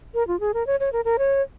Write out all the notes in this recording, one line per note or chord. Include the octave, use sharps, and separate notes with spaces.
A#4
F4
G#4
A#4
C#5
C#5
A#4
A#4
C#5